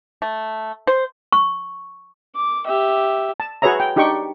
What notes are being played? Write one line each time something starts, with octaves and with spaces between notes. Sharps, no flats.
A3
C5
C#6
D6
G4 E5
A5
F#4 G#4 B4 C#5 E5 A#5
G5
D4 D#4 G4 G5 C#6